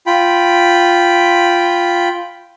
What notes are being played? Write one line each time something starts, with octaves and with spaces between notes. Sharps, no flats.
F4 G5 B5